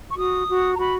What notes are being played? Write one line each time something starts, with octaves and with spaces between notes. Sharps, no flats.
C#6
F#4 D#6
F#4
A#5
F#4 B5